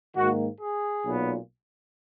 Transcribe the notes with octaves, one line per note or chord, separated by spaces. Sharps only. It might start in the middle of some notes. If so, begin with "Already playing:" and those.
G#2 D#3 A#3 F#4
G#4
B1 A#2 F#3 B3